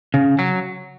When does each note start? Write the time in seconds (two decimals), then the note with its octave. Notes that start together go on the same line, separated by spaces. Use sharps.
0.14 C#3
0.39 F#3